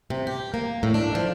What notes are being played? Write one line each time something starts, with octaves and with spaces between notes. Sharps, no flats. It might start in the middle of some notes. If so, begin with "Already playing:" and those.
C3
G4
A#3
A2
D4
F3